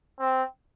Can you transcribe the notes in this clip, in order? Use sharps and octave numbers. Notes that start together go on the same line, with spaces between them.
C4